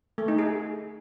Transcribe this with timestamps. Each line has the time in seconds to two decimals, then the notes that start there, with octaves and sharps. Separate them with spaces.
0.18 A3
0.28 D#4
0.38 G#4